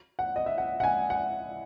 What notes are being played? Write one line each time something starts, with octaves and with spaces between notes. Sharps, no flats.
F#5
D#5
E5
F#5
F#5
G#5
F#5